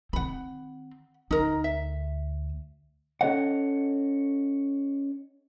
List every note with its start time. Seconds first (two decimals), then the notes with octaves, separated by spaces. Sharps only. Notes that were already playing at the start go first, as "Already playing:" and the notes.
0.13 D#3 C4 F#5 B5
1.31 D2 D#4 A#4
1.64 E5
3.21 C#4 A4 C#5 D#5 F#5